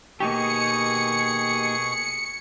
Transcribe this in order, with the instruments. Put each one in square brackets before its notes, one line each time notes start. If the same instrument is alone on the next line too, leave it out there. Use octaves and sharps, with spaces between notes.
[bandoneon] B2 C#6 [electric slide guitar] A#3 D#4 G4 [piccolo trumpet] G#4 [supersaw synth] C#7